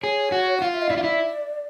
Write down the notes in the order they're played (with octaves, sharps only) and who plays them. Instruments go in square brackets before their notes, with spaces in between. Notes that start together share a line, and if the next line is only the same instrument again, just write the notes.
[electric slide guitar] G#4 [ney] C#5
[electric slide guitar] F#4
[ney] F#5
[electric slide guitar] F4 [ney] F5
[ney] E5
D#5
[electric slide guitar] E4 [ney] D5
[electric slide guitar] F4
E4